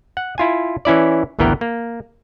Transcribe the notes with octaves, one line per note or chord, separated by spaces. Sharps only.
F#5
E4 F4 G#5
E3 C#4 E4 D5
G#1 D2 E3 B3 A#4 G5
A#3